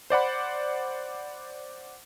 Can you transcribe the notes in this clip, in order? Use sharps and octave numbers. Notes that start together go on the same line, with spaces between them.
C5 D5 F#5 B5